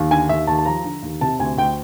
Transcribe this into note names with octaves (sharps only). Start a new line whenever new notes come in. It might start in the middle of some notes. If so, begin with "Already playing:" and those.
Already playing: D#2
D3 G#5
D#2 E5
D#2 A5
A5
F3 A#5
D3
D#2
C3 A5
D2 G#5
D2 G5